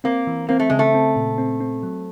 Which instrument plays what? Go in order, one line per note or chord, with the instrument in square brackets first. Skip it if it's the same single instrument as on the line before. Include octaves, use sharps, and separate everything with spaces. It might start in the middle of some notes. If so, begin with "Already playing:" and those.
[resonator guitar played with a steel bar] A#3 [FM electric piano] C4
[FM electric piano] E3
[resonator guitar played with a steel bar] A#3 [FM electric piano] C4
[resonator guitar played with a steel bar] A3
[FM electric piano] C#3 [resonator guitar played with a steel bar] G#3
[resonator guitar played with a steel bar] A3
[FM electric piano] C4
A#2
C4
C4
F#3